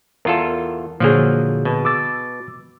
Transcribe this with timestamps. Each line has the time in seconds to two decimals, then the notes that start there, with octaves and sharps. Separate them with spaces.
0.25 E2 F4 A4 A#4
1.00 A#2 D3 F3 F#3 A#3 G#4
1.65 B2
1.85 D6 E6 A6